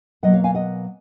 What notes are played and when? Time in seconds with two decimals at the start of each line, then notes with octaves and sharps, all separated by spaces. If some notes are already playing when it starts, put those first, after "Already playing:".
0.23 B2 F#3 A#3 D#5 F#5
0.33 C#5 F5
0.44 F5 G#5
0.55 D#5 F#5